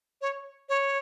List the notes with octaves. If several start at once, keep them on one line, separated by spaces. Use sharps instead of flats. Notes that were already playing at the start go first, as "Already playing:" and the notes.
C#5
C#5